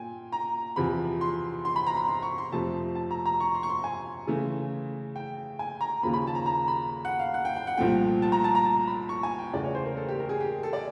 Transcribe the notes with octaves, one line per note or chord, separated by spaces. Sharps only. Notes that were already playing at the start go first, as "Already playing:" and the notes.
Already playing: A#2 G5 G#5
A#5
E2 C3 F3 B5
C6
C6
B5
A#5
B5
C6
C#6
C6
F2 C3 F3 A3 A5
A5
A#5
A#5
C#6
C6
C#6
C6
G#5
C#3 E3 A3
G5
G#5
A#5
D#2 C#3 F3 A#3 B5
B5
A5
A#5
A#5
B5
F#5
F5
F#5
G5
G5
F#5
C2 A#2 F3 A3 G5
A5
A#5
A5
A#5
A5
B5
C#6
G#5
G5
E2 C#3 E3 A3 D5
C#5
C5
A#4
A4
G4
A#4
G#4
G4
A4
D5